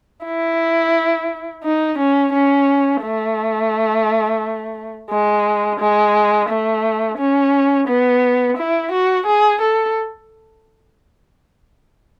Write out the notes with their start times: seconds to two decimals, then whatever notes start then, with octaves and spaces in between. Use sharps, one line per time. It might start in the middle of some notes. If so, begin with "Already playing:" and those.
0.25 E4
1.64 D#4
1.98 C#4
2.33 C#4
3.03 A3
5.10 G#3
5.80 G#3
6.49 A3
7.18 C#4
7.88 B3
8.57 E4
8.92 F#4
9.26 G#4
9.61 A4